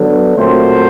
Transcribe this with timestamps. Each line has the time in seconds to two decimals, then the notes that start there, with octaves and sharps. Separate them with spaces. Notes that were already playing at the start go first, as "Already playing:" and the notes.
Already playing: D3 F#3 B3
0.37 A#2 F#3 A3 C4 C5